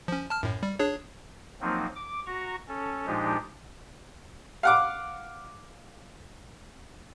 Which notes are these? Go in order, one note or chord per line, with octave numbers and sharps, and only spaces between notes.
F3 C#4
A5 F6
F#2 A2
G3
D4 G#4 C#5
F3 F#3 A#3 C4 D#4
D6
F#4 A#5 C#6
C#4 A4
A#2 F3 G#3 D4 D#4 G4
F5 F#5 D6